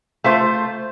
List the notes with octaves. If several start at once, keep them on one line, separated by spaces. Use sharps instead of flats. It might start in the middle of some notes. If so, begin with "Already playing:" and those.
A3 F4 C5